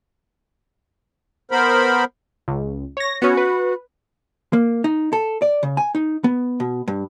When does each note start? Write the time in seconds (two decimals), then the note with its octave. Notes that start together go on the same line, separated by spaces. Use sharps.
1.51 B3 A#4 C5 B5
2.48 C#2
2.97 C#5 A#6
3.22 B3 C#4 F#4
3.37 B4
4.53 A#3
4.84 D#4
5.13 A4
5.42 D5
5.63 C#3
5.77 G#5
5.95 D#4
6.24 B3
6.60 B2
6.88 G2